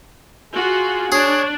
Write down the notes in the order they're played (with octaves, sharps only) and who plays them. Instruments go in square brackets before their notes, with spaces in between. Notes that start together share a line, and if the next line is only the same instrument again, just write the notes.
[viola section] F4 F#4 [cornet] G#4
[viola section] D4 [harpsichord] G#4 [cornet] C#5